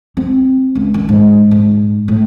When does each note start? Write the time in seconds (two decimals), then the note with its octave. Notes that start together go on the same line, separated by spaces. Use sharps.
0.17 C4
0.75 C#2
0.94 D#3
1.09 G#2
1.51 G#2
2.08 A2